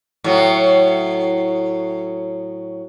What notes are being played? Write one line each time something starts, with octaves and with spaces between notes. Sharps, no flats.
A2 F#3